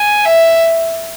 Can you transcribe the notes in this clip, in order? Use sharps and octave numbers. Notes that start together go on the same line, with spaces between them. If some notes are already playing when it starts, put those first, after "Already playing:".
Already playing: G#5
E5